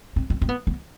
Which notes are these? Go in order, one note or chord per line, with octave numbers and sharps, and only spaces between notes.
C4
C4
C4
B3
B3